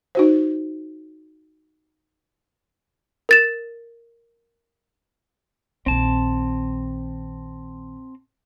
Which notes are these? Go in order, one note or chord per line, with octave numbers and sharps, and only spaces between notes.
D#4 F#4 C5
A#4 A6 E7
A#1 D#3 C4 A5